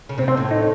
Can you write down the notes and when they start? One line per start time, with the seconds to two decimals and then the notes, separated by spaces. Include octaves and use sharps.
0.09 C#3
0.18 C3 C4
0.28 C4
0.37 A2
0.51 D#4